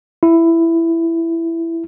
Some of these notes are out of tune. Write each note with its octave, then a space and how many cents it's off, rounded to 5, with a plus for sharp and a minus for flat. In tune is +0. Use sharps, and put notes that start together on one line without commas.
E4 +10